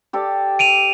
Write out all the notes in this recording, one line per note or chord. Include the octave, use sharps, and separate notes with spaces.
G4 A4 D5
D7 D#7 F7